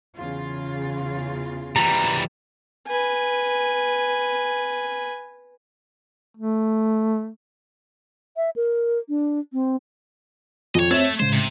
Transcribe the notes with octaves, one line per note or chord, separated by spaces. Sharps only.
E2 C#3 F4
E3 G3 A#5
B4 G#5
A3
E5
A#4
D4
C4
F2 C#5 D#5
A3 C4 C#5 E5 G#6
A2 C#3 G#3 C5
C3